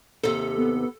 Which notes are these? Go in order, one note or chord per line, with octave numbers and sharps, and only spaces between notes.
D#2 C3 A4
B3